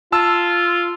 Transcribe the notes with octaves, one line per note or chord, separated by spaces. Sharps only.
F4 A5 E6